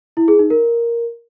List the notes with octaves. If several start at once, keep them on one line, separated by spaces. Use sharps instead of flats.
E4
G#4
D#4
A#4